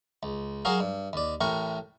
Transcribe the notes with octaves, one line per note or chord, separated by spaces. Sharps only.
C#2
F#3 F#4 G#4 A#4 F5
G2
D#2 D5
A1 A2 A#4 G5 C#6